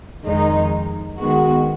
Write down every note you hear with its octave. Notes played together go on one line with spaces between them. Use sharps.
F2 D#3 G#3 D#4
D#3 G#3 B3 F#4